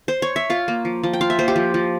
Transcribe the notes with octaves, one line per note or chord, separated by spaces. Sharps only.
C5
C#5
E5
F4 F5
A#3
F3
F3
G5
F4 F5
E5
A#3 C5
G4
F3
F3